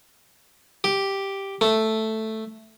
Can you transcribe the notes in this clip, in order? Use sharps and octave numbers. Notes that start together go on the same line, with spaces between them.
G4
A3